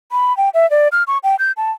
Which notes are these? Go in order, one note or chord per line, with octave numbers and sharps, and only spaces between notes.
B5
G5
E5
D5
F6
C#6
G5
G6
A5